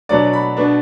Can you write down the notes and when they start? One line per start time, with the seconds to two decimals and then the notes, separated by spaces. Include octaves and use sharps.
0.09 B2 F#3 D4 D5
0.33 B5
0.57 B2 B3 D4